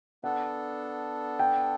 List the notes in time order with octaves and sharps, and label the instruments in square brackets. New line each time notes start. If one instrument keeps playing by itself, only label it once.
[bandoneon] B3 D4 A4 [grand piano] F#5
[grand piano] G5